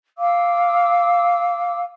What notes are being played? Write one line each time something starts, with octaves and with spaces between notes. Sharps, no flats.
F5 D6 E6